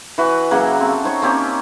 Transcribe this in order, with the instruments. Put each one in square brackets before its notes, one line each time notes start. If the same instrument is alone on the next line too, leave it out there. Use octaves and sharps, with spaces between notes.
[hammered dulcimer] E3 F#4 B4
C#3 F#3 A#3 F#5
C4 A4
D#4 C5 C#5 C#6
A#3 C4 C#4 G4